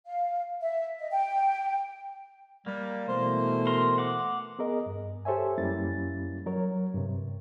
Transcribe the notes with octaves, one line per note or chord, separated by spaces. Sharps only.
F5
E5
D#5
G5
G3 A#3
B2 E3 A3 C5
A#4 C6
F#5 D6
B3 G#4 A#4 D#5
G2
G4 A4 C5 C#5 E5 G#5
F#2 G3 A#3 C#4 E4 A6
F#3 A#4 C#5
G2 C3